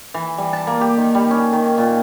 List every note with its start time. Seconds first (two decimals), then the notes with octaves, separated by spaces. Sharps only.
0.14 E3
0.38 G3
0.53 A5
0.67 A#3
0.81 G4
0.97 D#3
1.15 G3
1.31 C#4
1.52 D#3
1.78 A#2